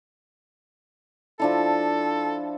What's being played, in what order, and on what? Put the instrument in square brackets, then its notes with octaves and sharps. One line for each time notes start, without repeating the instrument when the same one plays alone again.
[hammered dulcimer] F3 D4 E4 [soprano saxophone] A4